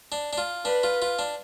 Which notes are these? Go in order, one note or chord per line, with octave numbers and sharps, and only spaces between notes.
D4
D4
F4
D4 B4
F4
F4
D4